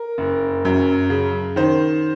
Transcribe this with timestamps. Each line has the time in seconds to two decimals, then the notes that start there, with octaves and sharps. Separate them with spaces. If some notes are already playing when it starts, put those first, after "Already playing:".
Already playing: A#4
0.18 F#1
0.65 F#2
1.10 C#3
1.56 D#3 C5